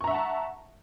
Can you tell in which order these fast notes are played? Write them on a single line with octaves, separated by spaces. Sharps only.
C#6 A#5 E5 F#5 A5